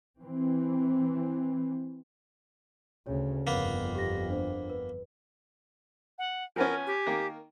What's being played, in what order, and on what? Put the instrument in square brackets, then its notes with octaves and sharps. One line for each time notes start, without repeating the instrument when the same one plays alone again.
[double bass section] E3 C4
[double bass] D2 C#3 [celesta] C#5
[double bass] G1 F2 [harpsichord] A#3 B3
[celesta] G4 A#6
D4 C5
B4
[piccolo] F#5
[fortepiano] F3 B3 C#4 [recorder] A#4 [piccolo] G#5
[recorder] G4
[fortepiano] D#3 A#3 A#4